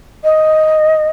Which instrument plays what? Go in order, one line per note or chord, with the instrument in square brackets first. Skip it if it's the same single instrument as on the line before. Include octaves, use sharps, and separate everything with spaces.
[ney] D#5